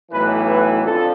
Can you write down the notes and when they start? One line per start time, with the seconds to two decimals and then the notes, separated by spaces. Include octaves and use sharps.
0.10 B1 A2 E3 B4
0.47 B4
0.83 F2 D3 F3 A4